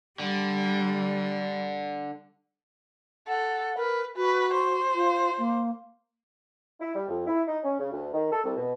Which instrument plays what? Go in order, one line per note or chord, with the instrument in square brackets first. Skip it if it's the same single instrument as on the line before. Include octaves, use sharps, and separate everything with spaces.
[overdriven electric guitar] D3 [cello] G3
[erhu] A4 [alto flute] F#5
[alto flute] A#4 [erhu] B4
[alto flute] F#4 [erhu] B4
[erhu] C5
[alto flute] F4
A#3
[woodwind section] E4
G3
F2
E4
D#4
C#4
C#3
D2
D#3
A4
C2
B2